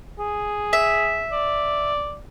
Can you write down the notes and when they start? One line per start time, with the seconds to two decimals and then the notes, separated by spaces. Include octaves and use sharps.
0.19 G#4
0.73 E5
1.32 D5